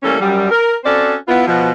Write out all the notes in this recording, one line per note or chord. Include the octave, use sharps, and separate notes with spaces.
E3 G3 A3 A#3 C#4 A4
F#2 G3
A#4
C4 C#4 F#4 A4 C5 D5
B3 E4 F4
B2 F3